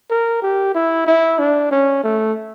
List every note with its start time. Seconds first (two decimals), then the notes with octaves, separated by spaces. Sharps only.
0.10 A#4
0.42 G4
0.75 E4
1.06 E4
1.39 D4
1.71 C#4
2.03 A3